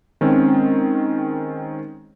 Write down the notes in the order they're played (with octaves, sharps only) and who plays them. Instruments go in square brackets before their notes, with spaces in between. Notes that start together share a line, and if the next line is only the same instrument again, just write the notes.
[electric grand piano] D#3 G#3 C4 C#4